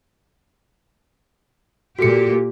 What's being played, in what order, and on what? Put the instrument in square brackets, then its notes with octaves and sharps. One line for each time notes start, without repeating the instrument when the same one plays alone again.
[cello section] A#2 G4 [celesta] F#4 A4 C#7